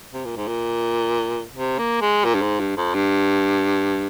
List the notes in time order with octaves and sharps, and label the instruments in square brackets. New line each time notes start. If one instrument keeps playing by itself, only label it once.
[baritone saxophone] C3
A#2
G#2
A#2
C3
A#3
G#3
A#2
G2
G#2
G2
F2
G2